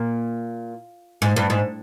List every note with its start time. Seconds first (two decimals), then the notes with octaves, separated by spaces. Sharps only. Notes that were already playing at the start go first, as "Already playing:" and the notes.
Already playing: A#2
1.22 G#2
1.36 G2
1.50 G#2